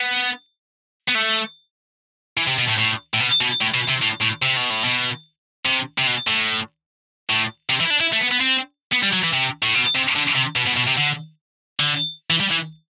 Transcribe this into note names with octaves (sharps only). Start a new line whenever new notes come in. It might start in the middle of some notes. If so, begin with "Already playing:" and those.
Already playing: B3
B3
A3
E3
C3
B2
A2
A2
A2
B2
B2
A2
B2
C3
A2
A2
C3
B2
A2
B2
C3
C3
B2
A2
A2
C3
E3
E4
D4
E4
A3
B3
B3
C4
B3
G3
F#3
E3
C3
A2
B2
C3
D3
C3
B2
B2
B2
C3
D3
D3
E3
G3
E3